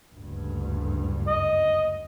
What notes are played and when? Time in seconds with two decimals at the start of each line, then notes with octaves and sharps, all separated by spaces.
0.15 F#1 D2 G2
1.27 D#5